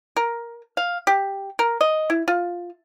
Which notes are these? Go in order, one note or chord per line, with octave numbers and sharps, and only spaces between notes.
A#4
F5
G4
A#4
D#5
E4
F4